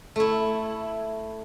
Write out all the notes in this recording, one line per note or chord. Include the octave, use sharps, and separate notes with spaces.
A3 E4